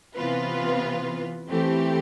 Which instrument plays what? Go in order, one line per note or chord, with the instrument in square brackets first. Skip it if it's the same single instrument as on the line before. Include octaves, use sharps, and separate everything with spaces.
[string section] C3 E3 B3 F4 B4
E3 A3 C4 G4